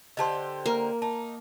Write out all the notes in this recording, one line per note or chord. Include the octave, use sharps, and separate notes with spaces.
D3 G4 C5 D#5 A5 C6
A#3 A#4
D#4 A5